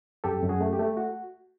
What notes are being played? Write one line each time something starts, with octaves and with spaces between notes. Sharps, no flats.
F#2 G4 A4
F#2
F#4 G#4
A3
G4
A3
F#4